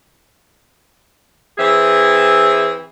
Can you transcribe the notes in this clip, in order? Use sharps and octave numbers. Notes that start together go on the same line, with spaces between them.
E3 C4 G#4 E5